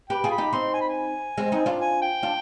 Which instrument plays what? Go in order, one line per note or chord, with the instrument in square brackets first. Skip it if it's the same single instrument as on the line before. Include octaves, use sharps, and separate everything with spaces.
[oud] G4 B4 [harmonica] G5
[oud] F4 G#4
[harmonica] B5
[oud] D#4 G4
[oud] C4 D#4 [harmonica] C6
[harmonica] G#5
B5
G#5
[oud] G#3 C4
C4 D#4
D4 F4
[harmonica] G#5
G5
[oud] D4 F4